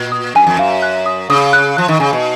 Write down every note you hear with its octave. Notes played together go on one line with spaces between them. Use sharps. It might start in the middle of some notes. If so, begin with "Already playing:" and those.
Already playing: A#2
D#6
F#2 G#5
F2
F#2 F5
F#6
D#6
C#3 D#6
F#6
F3 F#6
D#3
C#3 G#5
B2